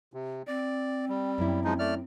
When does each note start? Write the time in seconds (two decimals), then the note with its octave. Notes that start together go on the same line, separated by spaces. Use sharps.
0.14 C3
0.47 C4 D5
1.09 G3
1.38 F#2 A#3 E4
1.64 F3 G#3 D#4
1.79 A3 D5 F6